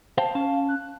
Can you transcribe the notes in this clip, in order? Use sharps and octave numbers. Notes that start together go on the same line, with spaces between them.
C5 F5 G5 A5
C#4 F5 A5
F#6